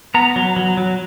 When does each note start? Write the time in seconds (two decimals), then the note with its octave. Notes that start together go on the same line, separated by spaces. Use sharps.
0.14 B3 A#5
0.36 F#3
0.56 F#3
0.77 F#3